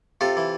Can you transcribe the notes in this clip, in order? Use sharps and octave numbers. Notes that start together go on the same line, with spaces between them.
C3 F4 A4
E3